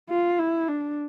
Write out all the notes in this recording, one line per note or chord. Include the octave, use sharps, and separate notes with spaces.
F4
E4
D4